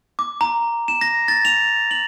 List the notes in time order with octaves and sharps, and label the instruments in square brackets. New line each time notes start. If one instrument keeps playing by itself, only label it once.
[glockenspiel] D6
A#5
E7
A#6
A6
F7
F#7